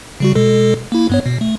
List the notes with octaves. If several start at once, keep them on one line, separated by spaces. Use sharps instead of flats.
C#3 G3 F#4
B2 G#3 A4
A#3 E4
G2 B3 C#5
B2
A3